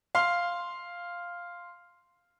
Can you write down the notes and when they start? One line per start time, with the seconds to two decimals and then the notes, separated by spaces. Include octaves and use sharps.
0.15 F5 C6